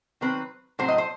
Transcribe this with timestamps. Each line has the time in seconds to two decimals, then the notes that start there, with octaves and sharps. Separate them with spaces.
0.21 D#3 F#3 C4 B4
0.79 A2 F#3 C4 C5
0.88 D#5
0.98 C5